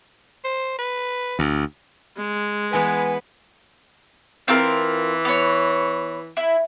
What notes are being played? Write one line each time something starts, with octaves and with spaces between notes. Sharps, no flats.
C5
B4
D2
G#3
E3 B3 B4 G#5
E3 C4 F4 A#4
B3 C#5
E4